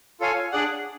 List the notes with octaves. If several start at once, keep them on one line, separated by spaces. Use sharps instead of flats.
F4 A4 C#5 F5 G#5
D4 G#4 D5 F#5